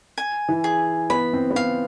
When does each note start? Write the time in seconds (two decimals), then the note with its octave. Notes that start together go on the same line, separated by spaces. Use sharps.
0.18 G#5
0.48 E3
0.64 G#4
1.10 B3 B5
1.33 C4
1.51 B3
1.56 C4 F5